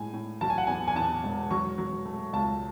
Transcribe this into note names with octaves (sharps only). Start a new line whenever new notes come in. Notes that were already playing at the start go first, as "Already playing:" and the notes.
Already playing: A2 G#3 G#5
A2
F#3 A5
G#5
F#5
E2 G#5
G#5
E2 A5
E1
F#3 C#6
F#3
A3
C#2 A5